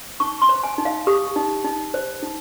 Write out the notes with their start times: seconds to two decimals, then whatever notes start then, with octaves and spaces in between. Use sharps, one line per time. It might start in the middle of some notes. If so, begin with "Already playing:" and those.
0.20 D#4 C#6
0.42 C6
0.49 C5
0.64 G#5
0.78 D#4
0.85 F5
1.07 G4 D#6
1.36 D#4
1.65 D#4
1.94 C5
2.23 D#4